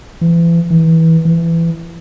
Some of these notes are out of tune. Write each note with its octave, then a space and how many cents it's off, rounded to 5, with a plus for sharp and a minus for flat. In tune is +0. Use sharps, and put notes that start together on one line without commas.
E3 +35
E3 -20
E3 +20